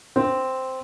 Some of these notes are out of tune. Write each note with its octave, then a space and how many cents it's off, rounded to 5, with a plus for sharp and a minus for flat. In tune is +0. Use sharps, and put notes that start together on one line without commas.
C4 -5